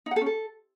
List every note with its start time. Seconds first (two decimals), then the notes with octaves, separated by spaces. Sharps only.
0.06 D#4
0.11 F#5
0.16 A4
0.21 C#4
0.26 A4